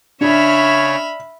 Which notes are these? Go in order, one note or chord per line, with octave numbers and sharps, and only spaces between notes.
C#3 D4 C#5 E5 B5 F6